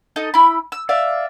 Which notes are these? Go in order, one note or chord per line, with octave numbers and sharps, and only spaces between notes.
D#4 A4 D#5
E4 B5
E6
D5 E5 F5